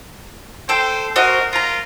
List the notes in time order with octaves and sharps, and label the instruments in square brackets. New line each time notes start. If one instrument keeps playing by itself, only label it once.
[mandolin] A4 G5 [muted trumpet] C5
[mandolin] F#4 C5 D#5 [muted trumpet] A#4
[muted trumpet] F4 [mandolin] A#4 A#5